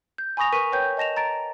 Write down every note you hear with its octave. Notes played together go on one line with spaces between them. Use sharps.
G6
G#5 B5 C#6 D#6 A#6 F7
A#4 B4 C#6 B6 D#7
B4 C#5 G5 G6
D#5 A5 A#6 E7 F7
A#5 A6 D7